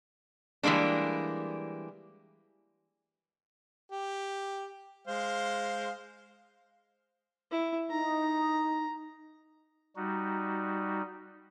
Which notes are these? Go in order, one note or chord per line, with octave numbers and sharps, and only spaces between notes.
E3 G3 G#3 A#3 D4
G4
G#3 C5 F5
E4
D#4 A#5
G3 D#4 F#4